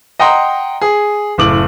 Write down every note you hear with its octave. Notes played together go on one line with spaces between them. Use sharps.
D#5 F#5 G5 A#5 C6
G#4
F#1 A2 D6 F#7